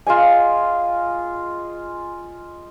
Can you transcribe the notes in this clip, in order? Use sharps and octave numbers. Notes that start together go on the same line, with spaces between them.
F4 G#4 D#5 G#5